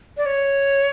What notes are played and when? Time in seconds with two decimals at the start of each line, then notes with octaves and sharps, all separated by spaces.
0.17 D5
0.26 C#5